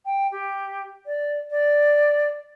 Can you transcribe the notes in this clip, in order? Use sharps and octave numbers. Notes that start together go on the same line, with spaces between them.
G5
G4
D5
D5